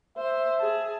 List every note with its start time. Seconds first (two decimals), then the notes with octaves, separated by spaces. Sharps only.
0.18 C5 E5
0.58 G#4 A5